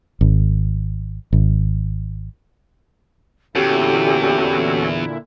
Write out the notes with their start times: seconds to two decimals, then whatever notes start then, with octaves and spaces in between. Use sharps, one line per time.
0.21 G#1
1.33 G#1
3.55 E2 A#2 D3 C#4 E4 F#4 G4 A4